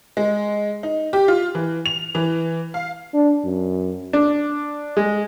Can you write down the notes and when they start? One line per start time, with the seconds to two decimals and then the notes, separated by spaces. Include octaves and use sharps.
0.17 G#3
0.83 D#4
1.13 G4
1.28 F4
1.55 E3
1.86 F7
2.15 E3
2.74 F5
3.14 D4
3.45 F#2
4.13 D4
4.97 G#3